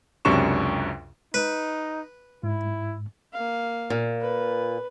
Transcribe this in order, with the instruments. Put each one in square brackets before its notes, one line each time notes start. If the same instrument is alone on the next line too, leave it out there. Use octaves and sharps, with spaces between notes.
[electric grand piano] C#2 F#2 C3 D4 C#6 E7
[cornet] D#4 [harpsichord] B4
[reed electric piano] G#2 [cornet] E4
[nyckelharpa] A#3 F5
[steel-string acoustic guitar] A#2
[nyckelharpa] B4